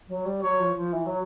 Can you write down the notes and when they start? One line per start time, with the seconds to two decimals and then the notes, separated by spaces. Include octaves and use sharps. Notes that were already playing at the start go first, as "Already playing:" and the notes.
0.08 F#3
0.25 G3
0.42 F#3 C#5
0.60 F3
0.76 F3
0.93 E3
1.06 F#3